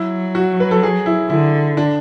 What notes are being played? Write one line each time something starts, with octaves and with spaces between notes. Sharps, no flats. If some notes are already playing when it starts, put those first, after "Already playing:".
Already playing: F#3 E4
F#4
B4
A4
G#4
E4
D3 E4
D4